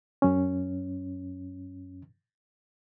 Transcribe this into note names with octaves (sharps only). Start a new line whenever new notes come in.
F#2 C#4